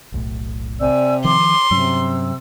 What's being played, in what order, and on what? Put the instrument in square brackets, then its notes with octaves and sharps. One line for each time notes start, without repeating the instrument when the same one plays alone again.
[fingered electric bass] E1 B1 A2
[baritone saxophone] C3 [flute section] D5 G#5 E6
[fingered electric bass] D#3 F3 [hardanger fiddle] C6 [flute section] D6
[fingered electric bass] G2 F#3 C#4 [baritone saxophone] C3 [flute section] E6